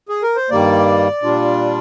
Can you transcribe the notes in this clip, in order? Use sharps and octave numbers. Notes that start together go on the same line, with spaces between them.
G#4
A#4
C5
G2 D#3 G3 A#3 D5
A#2 G3 D4 F4